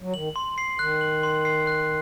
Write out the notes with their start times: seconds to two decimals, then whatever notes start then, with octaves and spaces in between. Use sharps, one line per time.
0.01 F#3
0.13 D#3 F#7
0.36 C6
0.58 C7
0.79 D#3 F#6
1.01 F#7
1.23 C6
1.45 C7
1.67 F#6